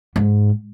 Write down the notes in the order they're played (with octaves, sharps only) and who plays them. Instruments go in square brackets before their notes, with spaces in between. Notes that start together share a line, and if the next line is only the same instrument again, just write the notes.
[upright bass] G#2